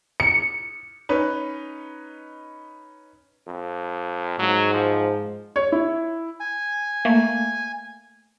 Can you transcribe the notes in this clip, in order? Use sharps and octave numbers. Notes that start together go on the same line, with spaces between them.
C#7
C#4 D#4 B4
F2
G#2 F#3
F3
C#5
E4
G#5
A3 A#3